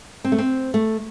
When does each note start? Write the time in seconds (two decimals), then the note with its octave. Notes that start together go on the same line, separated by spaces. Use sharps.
0.24 C4
0.32 A3
0.38 C4
0.74 A3